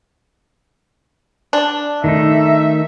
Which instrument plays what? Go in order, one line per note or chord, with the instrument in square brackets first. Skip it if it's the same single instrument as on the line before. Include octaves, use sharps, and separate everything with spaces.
[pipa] D4
[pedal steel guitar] D#3 A3 D#4 [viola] E5